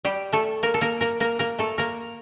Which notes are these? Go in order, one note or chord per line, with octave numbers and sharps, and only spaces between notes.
G3 G4
A3 A4
A#3 A#4
A4
A#3 A#4
A#3 A#4
A#3 A#4
A#3 A#4
A3 A4
A#3 A#4